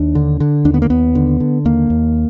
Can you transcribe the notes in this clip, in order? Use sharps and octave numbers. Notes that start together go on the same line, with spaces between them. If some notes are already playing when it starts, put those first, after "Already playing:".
Already playing: D#2 D4
D3
D3
D#2 D4
B3
A#3
D#2 B3
D3
D3
D#2 A#3
D#2